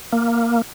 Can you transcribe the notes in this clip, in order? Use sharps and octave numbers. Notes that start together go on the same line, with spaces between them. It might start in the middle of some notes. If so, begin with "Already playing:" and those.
A#3